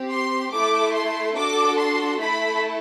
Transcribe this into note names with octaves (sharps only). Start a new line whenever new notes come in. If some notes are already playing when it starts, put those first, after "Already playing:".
Already playing: C4 G4
C6
A3 E4 A4 D6
C6
D4 F#4 A4 D6
C6
A3 E4 A4 B5